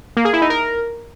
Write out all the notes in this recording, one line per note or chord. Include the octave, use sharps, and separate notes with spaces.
A#3
G#4
E4
D#4
A#4